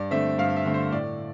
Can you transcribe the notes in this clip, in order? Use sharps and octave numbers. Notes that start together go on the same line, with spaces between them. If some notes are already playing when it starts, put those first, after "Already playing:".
Already playing: G2 D5
D3 A3 C4 E5
G2 F5
E5
D3 A3 C4
C5
A2 D5